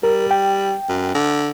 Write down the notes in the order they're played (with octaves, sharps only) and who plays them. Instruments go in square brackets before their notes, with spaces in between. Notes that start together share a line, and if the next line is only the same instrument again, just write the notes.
[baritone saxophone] G3 [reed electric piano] A#4
[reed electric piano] G5
[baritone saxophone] F#2
D3